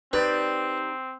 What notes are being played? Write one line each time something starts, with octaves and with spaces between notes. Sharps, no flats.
C4 D#4 G4 B4 D5